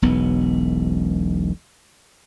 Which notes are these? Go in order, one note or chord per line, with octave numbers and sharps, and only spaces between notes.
E1 B1 B3